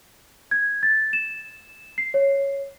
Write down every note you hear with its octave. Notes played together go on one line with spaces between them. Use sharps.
G#6
A6
E7
C7
C#5